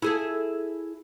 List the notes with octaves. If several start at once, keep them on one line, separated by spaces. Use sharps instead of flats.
E4 G#4 A4